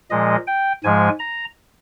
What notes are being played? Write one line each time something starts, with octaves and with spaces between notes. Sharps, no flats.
A#2 F3 G#3 D#5
G5
G#2 F3 G#3 G#5
A#5